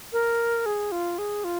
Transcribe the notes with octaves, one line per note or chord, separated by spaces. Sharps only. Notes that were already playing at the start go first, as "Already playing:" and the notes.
A#4
G#4
F4
G#4
F4